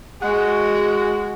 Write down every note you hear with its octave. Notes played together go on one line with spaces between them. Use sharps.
G#3 F#4